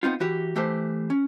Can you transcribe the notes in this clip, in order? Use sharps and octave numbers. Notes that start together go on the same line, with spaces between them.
B3 C4 D#4 F4
E3 F#4 G4
E3 A3 G4 B4 C5
C#4